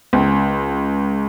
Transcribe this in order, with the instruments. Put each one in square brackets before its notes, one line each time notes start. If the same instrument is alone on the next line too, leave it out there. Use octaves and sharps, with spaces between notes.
[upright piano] C#2